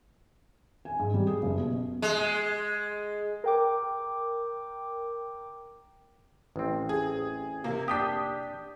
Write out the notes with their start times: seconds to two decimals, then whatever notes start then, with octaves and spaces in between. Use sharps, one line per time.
0.85 G#5
0.99 G#2
1.14 G3
1.27 G#4
1.42 F#1
1.58 B2
2.02 G#3
3.44 A#4 G5 D6
6.56 A1 C4
6.89 G#4
7.64 C3 A#3
7.88 D4 G4 D#6 G6 B6